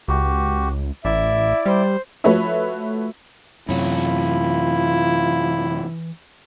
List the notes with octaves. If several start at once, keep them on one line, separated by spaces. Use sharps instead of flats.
C#2 F#4 G4
A1 E4 D5 E5
G3 C5
F3 A3 F#4 B4 C#5 E5
F#2 C3 E3 E4 F4 C#5